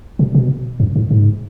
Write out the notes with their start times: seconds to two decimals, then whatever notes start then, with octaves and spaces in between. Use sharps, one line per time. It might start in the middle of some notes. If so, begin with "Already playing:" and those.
0.19 B2
0.35 B2
0.80 F#2
0.96 G#2
1.11 G#2